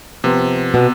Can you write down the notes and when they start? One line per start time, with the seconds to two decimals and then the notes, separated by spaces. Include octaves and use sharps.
0.24 C3 F3 B3
0.74 B2